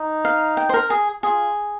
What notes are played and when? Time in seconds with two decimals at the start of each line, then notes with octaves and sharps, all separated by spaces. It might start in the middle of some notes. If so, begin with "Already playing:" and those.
Already playing: D#4
0.25 F5
0.57 G5
0.69 C5
0.74 A#4
0.90 G#4
1.23 F4 G#4